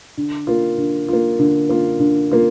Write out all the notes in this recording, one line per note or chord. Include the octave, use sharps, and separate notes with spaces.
D3
A#3 F4
D3
A#3 F4
D3
A#3 F4
D3
A#3 F4